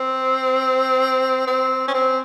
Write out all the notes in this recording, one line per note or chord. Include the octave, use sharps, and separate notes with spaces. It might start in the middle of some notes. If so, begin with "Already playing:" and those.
Already playing: C4
C4
C#4
C4